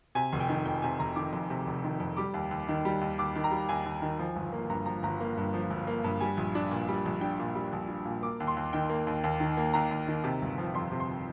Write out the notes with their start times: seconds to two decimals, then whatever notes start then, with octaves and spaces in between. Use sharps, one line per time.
0.15 C3 G#5
0.33 F1
0.40 G5
0.49 D#3
0.65 F2 G5
0.82 C3 G#5
0.99 F1 A#5
1.16 D#3 D6
1.33 F2
1.50 C3
1.67 F1
1.84 D#3
2.00 F2
2.17 G3 D6
2.34 D#2
2.51 D#2
2.68 D#3
2.85 G3
3.01 D#2
3.19 D#2 D6
3.35 D#3
3.44 A#5
3.51 G3
3.69 D#2 G#5
3.85 D#2
4.02 D#3
4.19 F3
4.36 G1
4.53 A#3
4.70 G2 A#5
4.86 F3 A#5
5.03 G1 A#5
5.20 A#3
5.37 G2
5.54 F3
5.70 G1
5.87 A#3
6.04 G2
6.20 G3 G#5
6.37 A#1
6.55 D4
6.71 A#2
6.88 G3
7.06 A#1
7.21 D4 G5
7.39 A#2
7.55 G3
7.73 A#1
7.88 D4
8.05 A#2
8.22 A#3 D6
8.40 D#2
8.47 C6
8.57 D#2
8.73 D#3 G5
8.89 A#3
9.07 D#2
9.24 D#2
9.40 D#3
9.57 A#3
9.73 D#2 A#5
9.91 D#2
10.08 D#3
10.24 C3
10.42 G1
10.58 F3
10.74 F2 C6
10.92 C3
11.00 C6